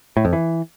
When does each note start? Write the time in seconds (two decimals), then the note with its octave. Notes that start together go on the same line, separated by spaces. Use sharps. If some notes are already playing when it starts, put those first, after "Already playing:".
0.17 A2
0.25 F2
0.33 E3